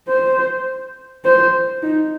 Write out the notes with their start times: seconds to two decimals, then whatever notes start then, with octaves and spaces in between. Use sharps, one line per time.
0.08 C5
1.25 C5
1.83 D#4